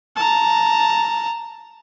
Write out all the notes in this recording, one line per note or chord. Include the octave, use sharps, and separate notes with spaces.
A5 A#5